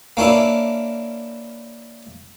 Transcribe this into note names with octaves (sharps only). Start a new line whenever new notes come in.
A#3 C#4 D4 E4